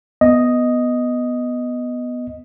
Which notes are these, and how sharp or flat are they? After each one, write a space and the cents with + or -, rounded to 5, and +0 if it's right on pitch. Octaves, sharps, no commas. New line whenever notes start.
B3 +0 D#5 +0